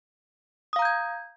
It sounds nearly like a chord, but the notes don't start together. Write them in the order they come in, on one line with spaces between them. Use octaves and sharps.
D#6 F5 A#5 G6 G#6